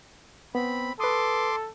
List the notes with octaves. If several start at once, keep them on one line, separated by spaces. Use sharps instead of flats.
B3 C4 B5
A4 B4 C6 D6 D#6